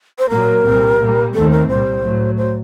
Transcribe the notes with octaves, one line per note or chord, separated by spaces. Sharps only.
C5
A#2 F#3 A#3 A#4
C2 A#2 G3 C4
A#2 G3 A#3
D#2 D#3 A3 C4 A4
A#4
C2 A#2 G3 C5
A2 F#3 A3
C5